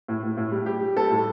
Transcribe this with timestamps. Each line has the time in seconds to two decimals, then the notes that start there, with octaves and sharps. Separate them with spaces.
0.08 A2
0.23 A2
0.37 A2
0.52 G3
0.66 G3 G4
0.81 G3
0.97 G3 A4
1.10 A2